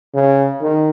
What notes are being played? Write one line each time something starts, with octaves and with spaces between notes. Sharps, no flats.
C#3
D#3